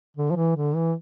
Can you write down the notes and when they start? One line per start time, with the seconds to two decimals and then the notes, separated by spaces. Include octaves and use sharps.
0.17 D3
0.31 F3
0.36 E3
0.56 D3
0.75 E3